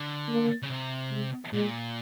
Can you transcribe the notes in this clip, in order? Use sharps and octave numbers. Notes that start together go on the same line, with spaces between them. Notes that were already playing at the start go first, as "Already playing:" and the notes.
Already playing: D3
A#3
C#3
C3
G#3
A#2 G#3